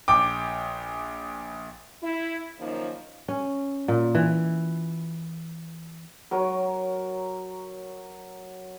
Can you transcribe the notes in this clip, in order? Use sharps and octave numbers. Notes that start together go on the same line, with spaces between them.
A#1 G5 D6
E4
F#2 D#3 F3 A#3 D#4
C#4
A#2
E3
F#3 A#4 C#5